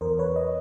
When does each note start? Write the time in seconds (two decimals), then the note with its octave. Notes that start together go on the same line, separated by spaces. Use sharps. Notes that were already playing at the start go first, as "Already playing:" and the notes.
0.01 E2 A#4 C5
0.19 B4 C#5
0.36 C#5 D#5